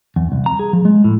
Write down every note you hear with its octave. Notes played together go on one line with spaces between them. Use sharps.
E2
C2
A#5
G#4
F3
G#3
A2